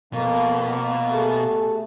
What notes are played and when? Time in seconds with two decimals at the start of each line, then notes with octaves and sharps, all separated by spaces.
0.13 F2 B2 A#3
1.12 A3 G4 G#4